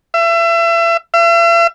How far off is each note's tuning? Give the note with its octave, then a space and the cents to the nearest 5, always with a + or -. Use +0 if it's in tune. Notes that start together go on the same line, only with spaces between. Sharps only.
E5 +35
E5 +45